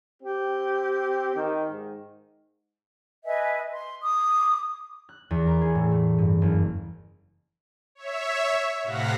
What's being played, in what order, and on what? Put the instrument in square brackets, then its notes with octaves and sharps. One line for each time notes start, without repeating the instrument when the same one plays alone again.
[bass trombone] C4 [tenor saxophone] G4
[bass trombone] D#3
G#2
[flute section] B4 D#5 E5 G#5
C6
D6 D#6
[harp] F#6
E2
A#4
G#4
A2
A3
G2
F#1
[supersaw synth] C#5 E5
A2 C3 F5 F#5 A#6 B6